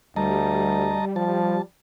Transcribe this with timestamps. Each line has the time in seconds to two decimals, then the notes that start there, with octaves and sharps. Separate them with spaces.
0.16 D2 G3 D#5 A5 A#5
1.16 F3 A5